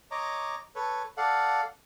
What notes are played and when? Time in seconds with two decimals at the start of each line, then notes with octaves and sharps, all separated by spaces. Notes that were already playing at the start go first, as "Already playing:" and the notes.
0.11 C#5 D#5 A#5 D6
0.75 A4 B4 C#5
1.17 A4 D5 F5 F#5